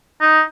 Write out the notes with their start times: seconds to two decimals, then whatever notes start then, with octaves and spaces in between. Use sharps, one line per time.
0.21 D#4